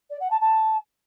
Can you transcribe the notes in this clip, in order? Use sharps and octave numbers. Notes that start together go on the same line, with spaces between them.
D5
F#5
A5
A5